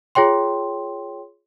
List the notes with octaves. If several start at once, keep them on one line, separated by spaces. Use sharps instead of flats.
F4 G#4 C#5 G5 C6